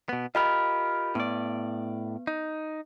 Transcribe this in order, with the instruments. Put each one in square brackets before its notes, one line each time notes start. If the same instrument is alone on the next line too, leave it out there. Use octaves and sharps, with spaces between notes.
[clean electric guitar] B2 B3
[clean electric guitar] F4 G4 A#4 [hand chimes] D#5 B5 F6
[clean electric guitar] A2 D5 [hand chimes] B3
[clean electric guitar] D#4